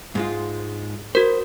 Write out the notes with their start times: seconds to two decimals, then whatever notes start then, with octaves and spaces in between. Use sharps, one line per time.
0.15 G#2 G#3 F4
1.15 F#4 A#4 C5